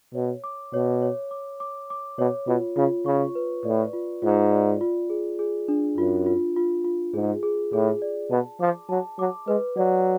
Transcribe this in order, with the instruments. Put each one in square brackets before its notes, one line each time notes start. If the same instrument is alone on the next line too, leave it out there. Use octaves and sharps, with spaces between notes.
[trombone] B2 [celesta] C#5
[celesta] D6
[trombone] B2 [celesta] C#5
[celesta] C#5
D6
D6
D6
[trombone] B2 [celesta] C#5
[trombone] B2 [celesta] F4
[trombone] C#3 [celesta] F4
[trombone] C#3 [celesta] C#6
[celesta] B4
[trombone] A2 [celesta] D5
[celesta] F4
[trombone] G#2 [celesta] F4
[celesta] D5
F4
G#4
G#4
D4
[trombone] F#2 [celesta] F4
[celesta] F4
F4
F4
[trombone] G#2 [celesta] G#4
[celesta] G#4
[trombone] A2 [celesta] G#4
[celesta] D5
[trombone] B2 [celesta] A5
[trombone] F3 [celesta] D6
[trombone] F#3 [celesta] A5
[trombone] F#3 [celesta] D6
[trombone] G#3 [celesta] B4
[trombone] F#3 [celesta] D5